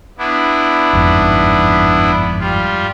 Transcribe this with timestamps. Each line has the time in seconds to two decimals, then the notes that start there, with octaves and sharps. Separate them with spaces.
0.18 B3 D4 E4
0.93 G1 F2 G#2
2.40 G3 F4